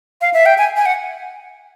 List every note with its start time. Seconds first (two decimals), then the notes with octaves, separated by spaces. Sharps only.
0.21 F5
0.34 E5
0.46 G5
0.58 G#5
0.77 G#5
0.86 F#5